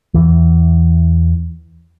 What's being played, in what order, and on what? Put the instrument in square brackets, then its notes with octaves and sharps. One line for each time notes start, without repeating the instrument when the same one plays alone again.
[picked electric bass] E2 E3